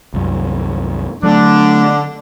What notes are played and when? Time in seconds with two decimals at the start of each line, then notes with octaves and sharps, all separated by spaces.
0.14 C2 F#2
1.23 D3 F#3 A3 D4